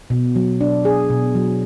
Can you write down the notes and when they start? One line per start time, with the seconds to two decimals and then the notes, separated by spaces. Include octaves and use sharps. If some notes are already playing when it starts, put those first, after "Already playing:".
0.10 B2
0.36 F#3
0.61 D4
0.85 G#4
1.10 B2
1.35 F#3